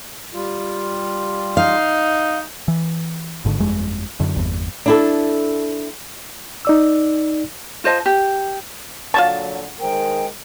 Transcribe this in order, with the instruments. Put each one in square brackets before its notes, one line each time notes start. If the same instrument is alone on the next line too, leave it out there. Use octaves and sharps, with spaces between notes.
[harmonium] G3 F4
[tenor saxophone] D#4 [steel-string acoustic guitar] F5
[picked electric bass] E3
G#1 G#2 D3
G1 F2 G#3
F#2 D3
G1 E2
[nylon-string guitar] D4 E4 A4
[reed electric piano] D#4 D5 E6
[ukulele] F4 C5 D#5 A5
G4
[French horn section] A#2 D3 F#3 [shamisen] F4 F#4 C#5 [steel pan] A5
[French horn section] D#3 G#3 A#4 [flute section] C5 G5